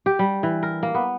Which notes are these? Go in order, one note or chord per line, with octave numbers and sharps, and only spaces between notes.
G4
G3
E3
A#4
A#3
B3